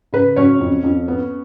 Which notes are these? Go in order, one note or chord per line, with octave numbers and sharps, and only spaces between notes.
C#3 B4
F#3 C#4 C#5
F2
F2
B3